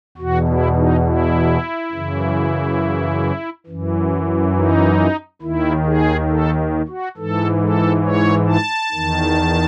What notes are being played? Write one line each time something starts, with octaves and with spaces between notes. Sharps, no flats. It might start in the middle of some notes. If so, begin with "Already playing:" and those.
E2 B2 F#4
E4
D#4
E4
F#2 C#3 E3
F#2 E3
D#4
D#2 D#3 E4
G#4
A4
F#4
G#2 E3 A4
A4
C#5
A5
E2 D#3